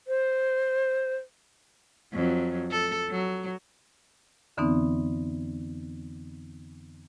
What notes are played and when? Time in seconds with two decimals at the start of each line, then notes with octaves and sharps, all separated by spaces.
0.08 C5
2.13 F2 F#3
2.71 A4
3.10 F#3
4.57 F2 D3 E3 B3 C4 D#4